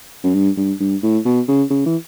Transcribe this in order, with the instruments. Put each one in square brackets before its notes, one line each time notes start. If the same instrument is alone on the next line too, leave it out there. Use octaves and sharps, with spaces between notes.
[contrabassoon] F#2
G2
G2
G2
A2
B2
C#3
C#3
E3